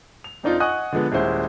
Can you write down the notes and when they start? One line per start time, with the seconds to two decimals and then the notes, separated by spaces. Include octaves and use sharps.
0.24 F7
0.43 F2 C4 D4 D#4 F4
0.60 D#5 F#5 G#5 C#6 D#6 F#6
0.92 D3 F3 G#3 B3
1.12 D#1 G#3 C#4 E4 C5 F#5